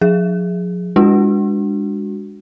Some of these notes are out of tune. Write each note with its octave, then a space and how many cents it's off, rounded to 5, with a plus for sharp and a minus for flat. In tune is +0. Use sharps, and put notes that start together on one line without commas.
F3 +45 G#4 +0
G#3 -20 D4 +0 F#4 +0